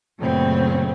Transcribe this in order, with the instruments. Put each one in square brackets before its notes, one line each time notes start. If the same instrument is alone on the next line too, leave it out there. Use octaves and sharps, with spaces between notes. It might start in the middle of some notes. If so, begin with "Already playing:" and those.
[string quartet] F#2 A#2 C#3 A3 B3 C4